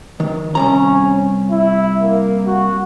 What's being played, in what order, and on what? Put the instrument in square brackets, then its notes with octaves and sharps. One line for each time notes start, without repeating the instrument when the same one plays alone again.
[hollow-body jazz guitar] D#3
[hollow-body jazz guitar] C2 F#2 A#5 [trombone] C#4
[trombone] E4
A#3
F#4